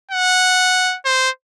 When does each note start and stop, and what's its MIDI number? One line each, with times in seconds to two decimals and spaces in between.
0.11 0.97 78
1.05 1.30 72